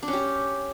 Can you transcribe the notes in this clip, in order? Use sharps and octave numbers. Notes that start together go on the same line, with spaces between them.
D4
C#4
G4